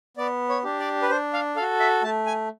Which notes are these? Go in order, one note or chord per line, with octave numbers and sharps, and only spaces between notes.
B3 D5
C#5
D4 G4
D5
B4
D4 C5
F5
F#4 A4 F5
E5
A3 A5
G#5